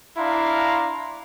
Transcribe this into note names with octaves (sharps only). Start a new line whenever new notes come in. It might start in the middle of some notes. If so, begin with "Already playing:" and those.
D4 E4 F5 A#5 C6